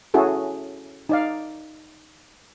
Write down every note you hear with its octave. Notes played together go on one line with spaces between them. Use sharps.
C#4 E4 F#4 G#4 A4
D#4 D5 F5